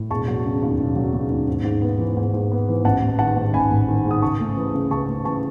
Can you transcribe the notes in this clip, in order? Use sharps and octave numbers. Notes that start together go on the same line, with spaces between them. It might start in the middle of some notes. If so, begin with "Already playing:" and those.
Already playing: A2
E1 A5 C#6
F#3
C#3
D#2
E1
F#3
C#3
D#2
G#2
G#2
B3
E3
G#2
G#2
B3
E3
A1 F#5 A5
A1
D#3 F#5 A5
G#2
A1 G#5 B5
A1
D#3
G#2
D#6
C#2 A5 C#6
A3
E3
C#3
C#2 A5 C#6
A3
E3 A5 C#6